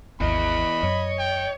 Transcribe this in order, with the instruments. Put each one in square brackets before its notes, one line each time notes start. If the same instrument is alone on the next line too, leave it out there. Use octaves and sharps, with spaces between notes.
[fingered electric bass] G#1 D#2 [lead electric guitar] B3 E4 [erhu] D#5 [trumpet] B5
[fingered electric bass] F#2 [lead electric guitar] C#5
[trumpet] G5